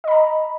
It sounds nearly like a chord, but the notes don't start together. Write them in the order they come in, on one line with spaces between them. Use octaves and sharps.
D#5 B5 A#5